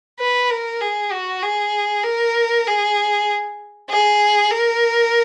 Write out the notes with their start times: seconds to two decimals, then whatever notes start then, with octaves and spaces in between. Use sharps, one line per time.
0.20 B4
0.50 A#4
0.81 G#4
1.12 F#4
1.43 G#4
2.04 A#4
2.67 G#4
3.90 G#4
4.51 A#4